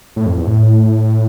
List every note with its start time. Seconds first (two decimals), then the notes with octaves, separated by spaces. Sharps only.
0.16 A2
0.26 F2
0.37 E2
0.47 A2